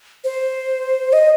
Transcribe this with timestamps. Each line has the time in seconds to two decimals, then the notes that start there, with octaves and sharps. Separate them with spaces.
0.24 C5
1.13 D#5